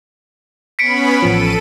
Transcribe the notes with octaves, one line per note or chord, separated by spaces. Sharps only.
B3 C#4 B5 B6 C#7 D7
A1 F3 A4 D#7